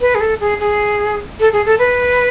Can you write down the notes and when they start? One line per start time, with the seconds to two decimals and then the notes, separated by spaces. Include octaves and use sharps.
0.01 B4
0.15 G#4
0.21 A4
0.41 G#4
0.60 G#4
1.40 A4
1.53 G#4
1.66 A4
1.79 B4